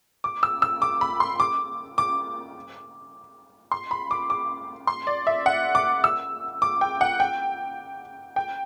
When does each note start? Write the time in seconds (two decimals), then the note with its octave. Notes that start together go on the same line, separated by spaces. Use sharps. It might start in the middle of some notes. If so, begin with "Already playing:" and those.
0.24 D6
0.43 E6
0.62 E6
0.82 D6
1.01 B5
1.20 C6
1.40 D6
1.98 D6
3.72 C6
3.91 B5
4.11 D6
4.30 D6
4.87 C6
5.07 D5
5.27 E5
5.46 F#5
5.75 D6
6.04 E6
6.62 D6
6.81 G5
7.01 F#5
7.20 G5
8.36 G5